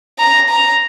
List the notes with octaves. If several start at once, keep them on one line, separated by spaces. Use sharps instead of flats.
A#5
A#5